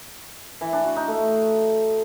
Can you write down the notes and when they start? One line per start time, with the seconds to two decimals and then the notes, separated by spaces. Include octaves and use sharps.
0.61 E3
0.73 D4
0.85 F#4
0.96 D#4
1.08 A3